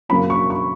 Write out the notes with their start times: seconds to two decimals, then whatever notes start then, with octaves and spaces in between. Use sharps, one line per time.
0.09 F#2 C#3 F#3 A#3 C#4 B5
0.30 C#6
0.50 C#6